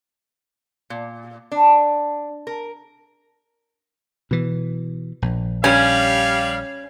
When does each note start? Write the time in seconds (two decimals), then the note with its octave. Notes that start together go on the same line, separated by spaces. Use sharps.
0.90 A#2
1.52 D4
2.47 A#4
4.31 B2 E3
5.22 A#1
5.64 G3 C#4 F5